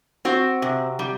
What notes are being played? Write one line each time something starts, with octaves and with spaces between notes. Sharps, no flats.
C4 F#4
C3
G3